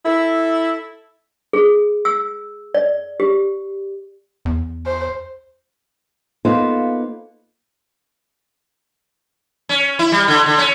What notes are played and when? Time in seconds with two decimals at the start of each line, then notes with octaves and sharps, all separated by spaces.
0.04 E4 A4
1.53 G#4
2.05 E6
2.74 D5
3.20 G4
4.45 E2
4.86 C5
6.45 A#3 B3 D#4 F4 A4 C5
9.69 C#4
9.99 E4
10.12 G3
10.28 D3
10.46 D3
10.58 C#4